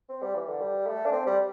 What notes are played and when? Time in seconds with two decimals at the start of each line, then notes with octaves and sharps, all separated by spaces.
0.09 C4
0.22 G3
0.35 E3
0.48 D3
0.61 G3
0.87 A3
1.06 D4
1.12 C4
1.27 G3